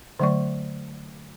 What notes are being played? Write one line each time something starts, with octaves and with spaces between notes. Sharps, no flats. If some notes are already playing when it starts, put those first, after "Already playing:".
D3 F#3 A3 D5 C#6